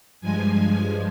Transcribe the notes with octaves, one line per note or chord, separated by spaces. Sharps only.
G2 F3 G#3 G#5